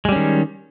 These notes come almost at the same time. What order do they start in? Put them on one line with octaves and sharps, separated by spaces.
G#3 G3 C#4 D#3